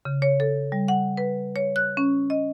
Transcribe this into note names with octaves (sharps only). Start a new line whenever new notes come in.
C#3
C#5
A4
G3
F#5
B4
C#5
F#6
C#4
D#5